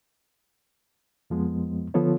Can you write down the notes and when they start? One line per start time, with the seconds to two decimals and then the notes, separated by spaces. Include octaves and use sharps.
1.30 F2 F3 G#3 B3
1.94 D3 F3 B3 F4 A4 C#5